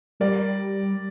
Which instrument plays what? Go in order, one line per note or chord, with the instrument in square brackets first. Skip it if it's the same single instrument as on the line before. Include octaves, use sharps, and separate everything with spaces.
[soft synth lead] G3 [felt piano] A#4 D5